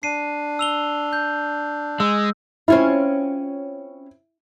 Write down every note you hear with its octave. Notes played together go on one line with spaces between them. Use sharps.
D4 C7 D#7
E6 F7 G7
G6
G#3 E6
C4 C#4 E4 F4